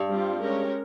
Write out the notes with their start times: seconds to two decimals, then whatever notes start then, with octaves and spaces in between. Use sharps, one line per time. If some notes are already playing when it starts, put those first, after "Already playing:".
Already playing: G2
0.09 G3 C4 F4
0.40 G#3 C#4 G4 A#4 C#5